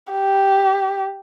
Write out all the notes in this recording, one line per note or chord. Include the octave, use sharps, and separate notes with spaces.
G4